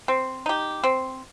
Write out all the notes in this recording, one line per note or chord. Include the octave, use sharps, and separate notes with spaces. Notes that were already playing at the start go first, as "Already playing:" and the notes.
C4
D#4 G4
C4